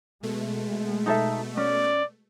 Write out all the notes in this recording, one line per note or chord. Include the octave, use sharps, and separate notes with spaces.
B2 G#3 A3
D#4 A4 E5
C#4 D5